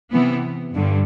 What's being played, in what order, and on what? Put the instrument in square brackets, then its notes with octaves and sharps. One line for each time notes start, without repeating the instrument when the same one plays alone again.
[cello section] C3 E3 B3
G2 D3